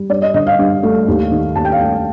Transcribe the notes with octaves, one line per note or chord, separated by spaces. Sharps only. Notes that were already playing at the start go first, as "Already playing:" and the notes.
Already playing: G3
G2 D5
D#5
D3 D#5
F5
G2
A3
D#2
D#3
D#2 A5
G5
F5
A3 G5